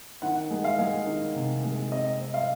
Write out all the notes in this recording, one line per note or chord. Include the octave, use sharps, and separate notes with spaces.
D#3 F#5
G#3
F5
G#3
D#3
C3
G#3
C4 D#5
C4
F5